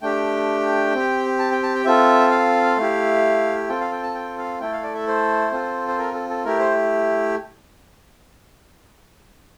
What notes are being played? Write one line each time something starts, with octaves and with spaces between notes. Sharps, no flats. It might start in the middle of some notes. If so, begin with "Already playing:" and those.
A3 D4 G4 G5
C4 G4
A5
G5
A5
G5
C4 F4 A4 E5
F5
A3 E4 G4
C4 F4 A4 G5
F5
G5
A5
G5
F5
A3 E4 A4 G5
F5
D5
E5
C5
C4 F4 A4
C5
A#4
A4
A4
A3 E4 G4 A#4
C5